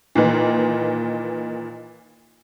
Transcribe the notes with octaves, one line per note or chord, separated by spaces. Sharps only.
A#2 D#3 E3